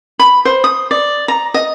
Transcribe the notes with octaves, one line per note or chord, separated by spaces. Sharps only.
B5
C5
D#6
D5
A#5
D#5